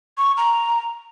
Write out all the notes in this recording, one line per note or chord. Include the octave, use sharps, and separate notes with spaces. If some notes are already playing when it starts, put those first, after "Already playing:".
C#6
A#5